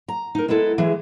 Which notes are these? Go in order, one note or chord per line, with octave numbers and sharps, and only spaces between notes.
A#5
D#4 A#4
G#3 B3 E4 A4
E3 G#3 G#4